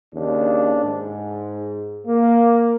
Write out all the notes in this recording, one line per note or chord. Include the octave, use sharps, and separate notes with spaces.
D#2 C#3 D4
G#2
A#3